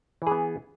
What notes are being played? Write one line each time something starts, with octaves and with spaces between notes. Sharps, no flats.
E3 B3 G#4